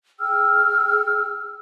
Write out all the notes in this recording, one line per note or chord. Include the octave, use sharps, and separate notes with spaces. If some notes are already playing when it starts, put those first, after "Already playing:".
G#4 G5 E6 F6